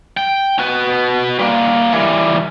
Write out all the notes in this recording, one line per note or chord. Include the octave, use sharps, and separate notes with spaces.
G5
F#4 B4
G3 A#3
E3 G3